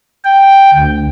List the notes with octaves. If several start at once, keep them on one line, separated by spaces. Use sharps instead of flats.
G5
D2